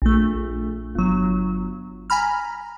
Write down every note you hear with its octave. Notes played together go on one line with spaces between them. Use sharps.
A#1 A3
G1 F#3
G#5 A#5 B5 F6